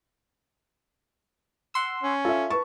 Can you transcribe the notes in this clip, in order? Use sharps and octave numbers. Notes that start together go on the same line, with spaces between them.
F#5 C6 E6
C#4
F4 A4 E5
B4 A5 C#6